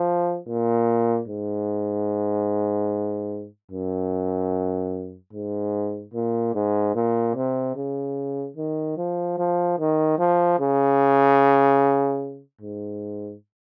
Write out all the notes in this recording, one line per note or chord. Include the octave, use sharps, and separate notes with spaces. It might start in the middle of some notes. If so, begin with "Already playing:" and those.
Already playing: F3
A#2
G#2
F#2
G#2
A#2
G#2
A#2
C3
C#3
D#3
F3
F3
D#3
F3
C#3
G#2